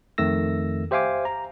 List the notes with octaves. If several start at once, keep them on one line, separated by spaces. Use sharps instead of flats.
F2 D#3 A3 E6 A#6
G4 C5 E5 F5 G#5 D6
A#5